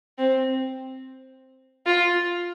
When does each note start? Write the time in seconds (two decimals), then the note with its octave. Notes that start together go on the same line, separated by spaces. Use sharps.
0.18 C4
1.86 F4